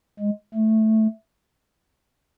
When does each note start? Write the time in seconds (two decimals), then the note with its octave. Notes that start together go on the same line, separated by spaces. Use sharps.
0.19 G#3
0.54 A3